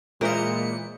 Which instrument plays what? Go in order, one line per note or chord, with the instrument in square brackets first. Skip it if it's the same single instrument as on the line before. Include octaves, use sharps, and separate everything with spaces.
[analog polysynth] A#2 C#7 [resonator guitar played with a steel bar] E3 C5 E5 [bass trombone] G#3 [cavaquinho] A#4 D#5